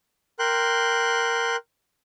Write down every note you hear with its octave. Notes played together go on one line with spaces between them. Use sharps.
A#4 G5 C6 F#6